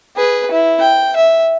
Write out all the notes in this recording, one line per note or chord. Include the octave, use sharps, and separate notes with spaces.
G#4 B4
E4
G5
E5